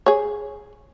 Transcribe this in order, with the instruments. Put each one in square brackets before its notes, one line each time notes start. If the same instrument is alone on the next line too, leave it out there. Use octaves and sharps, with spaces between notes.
[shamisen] G#4 C#5